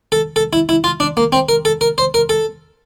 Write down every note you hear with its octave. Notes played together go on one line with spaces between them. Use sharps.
A4
A4
E4
E4
F4
D4
A#3
C4
A#4
A4
A#4
C5
A#4
A4